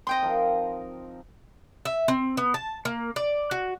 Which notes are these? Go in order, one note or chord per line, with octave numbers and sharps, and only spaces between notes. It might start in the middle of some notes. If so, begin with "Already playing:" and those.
C4 D#4 D#5 G5 C6
F3 A#4
E5
C4
B3
A5
A#3
D5
F#4